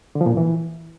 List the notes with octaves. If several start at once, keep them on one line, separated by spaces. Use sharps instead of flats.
D3
F3
A#2
E2
E3